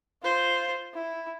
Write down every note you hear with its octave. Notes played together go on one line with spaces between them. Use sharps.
F4 C5
E4